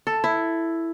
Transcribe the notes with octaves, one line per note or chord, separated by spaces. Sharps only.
A4
E4